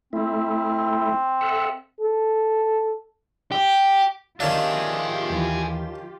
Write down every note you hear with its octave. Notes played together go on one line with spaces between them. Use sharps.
A3 C4 E4
A4 E5 F#5
A4
G4
D#3 C#4 D4 F4 G4 G#4 E5 F5
D#2 E3